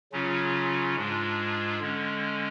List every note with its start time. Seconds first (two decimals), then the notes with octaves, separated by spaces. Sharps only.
0.12 C#3 F#3 C#4 F4
0.96 G#2 G#3 D4 F4
1.80 D3 G#3 C#4